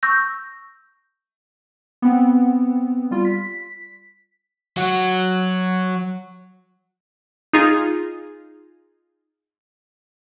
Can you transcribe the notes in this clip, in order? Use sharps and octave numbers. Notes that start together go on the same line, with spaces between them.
C#6 E6 G6 A#6
B3 C4
G3 F4
B6
F#3 F#4
D#4 F4 G#4